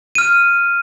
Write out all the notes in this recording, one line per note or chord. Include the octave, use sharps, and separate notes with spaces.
F6 D#7